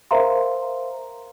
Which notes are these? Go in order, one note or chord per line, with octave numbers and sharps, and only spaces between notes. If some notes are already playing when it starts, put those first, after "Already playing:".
A#4 C5 E5 F5 A#5 C6